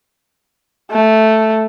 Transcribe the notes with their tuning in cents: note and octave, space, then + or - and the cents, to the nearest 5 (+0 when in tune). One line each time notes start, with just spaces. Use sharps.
A3 +0